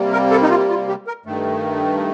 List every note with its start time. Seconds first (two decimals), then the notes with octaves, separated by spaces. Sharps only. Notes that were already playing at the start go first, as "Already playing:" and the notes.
Already playing: C3 G3 A#3
0.13 A#4
0.31 A4
0.42 D#4
0.50 F4
0.69 F4
0.88 G4
1.07 A#4
1.25 G2 D#3 A3